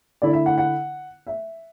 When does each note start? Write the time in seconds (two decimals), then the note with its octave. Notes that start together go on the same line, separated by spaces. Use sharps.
0.22 D3 A3 E4 D5
0.33 E5
0.46 F#5
0.58 F#5
1.27 E5